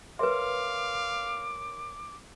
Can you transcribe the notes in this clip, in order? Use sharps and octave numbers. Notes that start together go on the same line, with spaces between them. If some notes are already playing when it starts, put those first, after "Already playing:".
A#4 B4 C#5 E5 F5 C6 D6